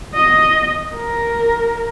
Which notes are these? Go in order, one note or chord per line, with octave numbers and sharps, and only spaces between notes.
D#5
A#4